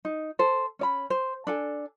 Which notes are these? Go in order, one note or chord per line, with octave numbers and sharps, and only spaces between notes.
D#4
A4 C5
C#4 D5 B5
C5
D4 A4 G#5